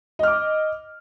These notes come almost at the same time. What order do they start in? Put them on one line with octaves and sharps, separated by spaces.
D#5 F6 D6